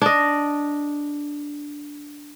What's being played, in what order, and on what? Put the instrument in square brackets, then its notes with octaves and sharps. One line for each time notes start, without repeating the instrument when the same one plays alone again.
[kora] D4 D#5